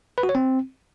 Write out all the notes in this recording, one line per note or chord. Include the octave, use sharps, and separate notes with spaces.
B4
F#4
C#5
C4